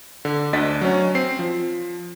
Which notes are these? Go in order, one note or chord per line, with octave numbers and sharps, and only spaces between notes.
D3
D2 D4 D#5 A6 B6
F#3 C#4
C4 C7
F3